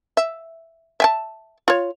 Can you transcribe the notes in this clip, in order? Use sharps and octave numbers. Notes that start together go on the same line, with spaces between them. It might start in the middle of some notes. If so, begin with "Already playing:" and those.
E5
E5 G#5 A5
F4 C#5